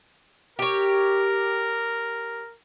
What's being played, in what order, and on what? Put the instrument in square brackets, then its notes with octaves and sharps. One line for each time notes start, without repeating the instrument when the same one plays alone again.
[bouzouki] G4 C#5 [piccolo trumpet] A#4